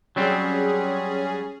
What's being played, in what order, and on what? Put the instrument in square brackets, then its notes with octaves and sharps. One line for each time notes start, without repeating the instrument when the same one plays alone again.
[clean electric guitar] F#3 G3 C4 [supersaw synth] C#4 G#4